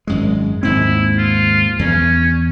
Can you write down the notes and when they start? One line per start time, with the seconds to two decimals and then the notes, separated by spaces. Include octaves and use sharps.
0.07 G#1 F#2 G#3
0.63 D#2 G#2 C4 E4
1.18 F4
1.79 E2 C#4